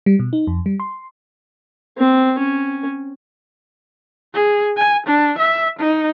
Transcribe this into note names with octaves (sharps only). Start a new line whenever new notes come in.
G3
B2
D#4
F2
G3
C6
C4
C#4
G#4
G#5
D4
E5
D#4